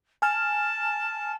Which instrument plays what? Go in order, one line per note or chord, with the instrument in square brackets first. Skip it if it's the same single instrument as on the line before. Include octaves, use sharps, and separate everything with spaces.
[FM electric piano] G#5 F6 [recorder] A5